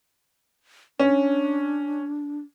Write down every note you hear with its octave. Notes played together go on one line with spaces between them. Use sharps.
C#4 D4